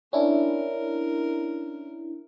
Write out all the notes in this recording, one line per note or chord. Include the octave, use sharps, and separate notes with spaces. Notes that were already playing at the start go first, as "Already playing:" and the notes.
C#4 D4 E4 A#4